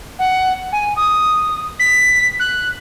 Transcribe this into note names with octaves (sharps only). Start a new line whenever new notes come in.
F#5
G#5
D#6
B6
F#6